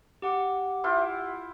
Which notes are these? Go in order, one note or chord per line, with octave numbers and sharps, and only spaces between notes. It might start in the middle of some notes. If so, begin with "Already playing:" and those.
G4 F#5 D6
E4 F4 G5